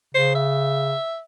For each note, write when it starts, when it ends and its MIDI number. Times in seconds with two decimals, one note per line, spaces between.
0.15 0.94 49
0.15 0.32 72
0.35 1.20 76